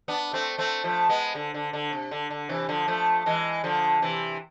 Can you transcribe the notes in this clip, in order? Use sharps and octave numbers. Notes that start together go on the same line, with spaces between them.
B3 D4
A3 C4
A3 C4
F3 A3
G#3 B3
D3
D3
D3
C3
D3
D3
C3 E3
D3 F3
F3 A3
E3 G#3
D3 F3
C3 E3